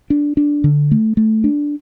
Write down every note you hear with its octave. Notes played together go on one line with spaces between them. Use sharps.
D4
D4
D3
A3
A3
D4